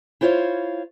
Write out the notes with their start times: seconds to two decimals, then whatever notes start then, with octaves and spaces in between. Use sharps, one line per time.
0.21 E4 F4 C5 C#5 F5